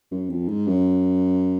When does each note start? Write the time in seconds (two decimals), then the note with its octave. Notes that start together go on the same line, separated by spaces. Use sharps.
0.11 F#2
0.30 F2
0.49 G#2
0.67 F#2